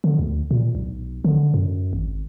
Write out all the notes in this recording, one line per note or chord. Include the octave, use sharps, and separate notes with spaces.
D3
D2
A#2
B1
D3
F#2
G#1